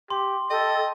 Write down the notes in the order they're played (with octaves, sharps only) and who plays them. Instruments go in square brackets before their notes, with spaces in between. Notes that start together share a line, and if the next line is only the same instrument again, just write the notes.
[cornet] G4 [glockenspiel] C6
[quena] A4 [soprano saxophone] D#5 [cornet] G5